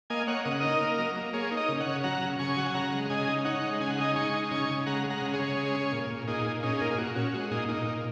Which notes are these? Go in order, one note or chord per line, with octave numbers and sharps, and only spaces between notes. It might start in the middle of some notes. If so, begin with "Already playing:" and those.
A#3 D#5 G#5
A#3 C#5 F#5
C#3 D#5
F#5
D#4 A#4 D#5
A#3
F#3
A#3
A#3 G#4 C#5
D#4
A#4 D#5
C#3
C#5 F#5
C#3
F#3 F#5 A#5
C#3
C#3 G#5 C#6
F#3 F#5
G#5
C#3 F#5 A#5
G#3
C#3 D#5 G#5
D#4
D#4 C#5 F#5
G#3
C#3 G#5
F#5
D#4 D#5 G#5
G#3 G#5 C#6
D#4
C#3 G#5 C#6
C#3
G#3 F#5 A#5
G#3
F#5 A#5
C#3
G#4 C#5
C#3
G#3
C#4
A#2
A#2
A#2 D#4 G#4
A#2
C#4 D#4 G#4
A#2 A#4
G#4
A#2 F#4
C#4 F#4
G#3 F#4
A#2 D#4 G#4
A#2 D#4
A#2